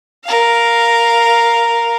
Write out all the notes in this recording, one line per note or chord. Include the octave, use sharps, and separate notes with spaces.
A#4 F5